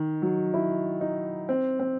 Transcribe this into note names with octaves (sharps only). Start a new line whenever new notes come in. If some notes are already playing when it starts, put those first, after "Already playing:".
Already playing: D#3
F#3
E4
D#4
C4
C4